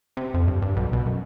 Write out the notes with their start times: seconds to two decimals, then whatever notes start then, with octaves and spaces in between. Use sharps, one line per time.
0.17 C3
0.34 F2
0.48 G2
0.62 G2
0.77 B1
0.93 B2
1.06 F#2